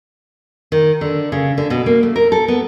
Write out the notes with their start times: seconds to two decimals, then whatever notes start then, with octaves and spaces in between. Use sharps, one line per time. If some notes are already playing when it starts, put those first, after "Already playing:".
0.72 D#3
1.01 D3
1.32 C#3
1.58 D3
1.70 B2
1.86 A#3
2.03 A3
2.16 A#4
2.32 A4
2.48 B3